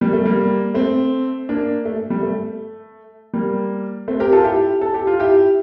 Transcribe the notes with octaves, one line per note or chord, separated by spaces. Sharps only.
G3 A#3
A3
G3 A#3
A3 C4
A#3 D4
A3
G3
A3
G3 A#3
A3 C4
G4 A#4
F4 A4
E4 G4
A4
G4
F4
E4 G4